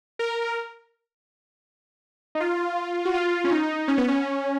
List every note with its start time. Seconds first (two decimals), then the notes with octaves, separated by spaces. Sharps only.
0.19 A#4
2.35 D#4
2.40 F4
3.05 F#4
3.14 F4
3.44 C#4
3.51 D#4
3.88 C#4
3.98 B3
4.08 C#4